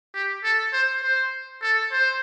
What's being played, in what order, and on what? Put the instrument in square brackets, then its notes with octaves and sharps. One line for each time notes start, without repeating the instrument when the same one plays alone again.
[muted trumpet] G4
A4
C5
C5
A4
C5